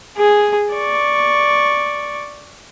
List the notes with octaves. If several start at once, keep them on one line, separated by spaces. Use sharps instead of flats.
G#4
D5 C#6